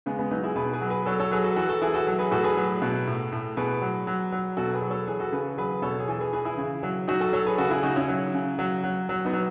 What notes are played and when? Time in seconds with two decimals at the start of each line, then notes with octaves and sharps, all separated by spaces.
0.06 C#3 G#3 B3
0.19 G#3 B3
0.31 F#3 B3 D#4
0.44 E4 G#4
0.56 B2 G#4 B4
0.73 G#4 B4
0.81 F#3
0.90 G#4 B4
1.06 F#3 A4 C#5
1.20 A4 C#5
1.31 F#3 G#4 B4
1.43 F#4 A4
1.56 E3 F#4 A4
1.69 F#4 A4
1.82 E3 E4 G#4
1.94 F#4 A4
2.07 F#3
2.19 G#4 B4
2.31 A2 F#4 A4
2.44 G#4 B4
2.57 F#3
2.82 B2
3.07 A2
3.32 A2
3.57 B2 G#4 B4
3.82 F#3
4.07 F#3
4.32 F#3
4.57 B2 F#4 A4
4.74 G#4 B4
4.82 F#3
4.90 A4 C#5
5.07 E3 G#4 B4
5.20 F#4 A4
5.32 C#3 G#4 B4
5.58 F#3 G#4 B4
5.82 B2 A4 C#5
5.99 G#4
6.08 E3 A4
6.20 G#4 B4
6.33 E3 G#4 B4
6.45 E4 G#4
6.57 C#3
6.83 F#3
7.08 F#3 D#4 F#4
7.20 F#4 A4
7.33 F#3 A4 C#5
7.46 G#4 B4
7.58 C#3 F#4 A4
7.71 E4 G#4
7.83 C#3 D#4 F#4
7.96 C#4 E4
8.08 F#3
8.34 C#3
8.59 F#3
8.83 F#3
9.09 F#3
9.25 B3 D#4
9.33 F#3